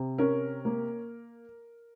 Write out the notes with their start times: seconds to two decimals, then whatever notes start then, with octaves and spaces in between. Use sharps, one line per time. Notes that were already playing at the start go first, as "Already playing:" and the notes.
Already playing: C3
0.18 C#4 A#4
0.65 A#3